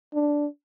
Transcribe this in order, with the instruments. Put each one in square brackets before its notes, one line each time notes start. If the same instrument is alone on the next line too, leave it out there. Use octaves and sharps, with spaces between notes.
[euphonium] D4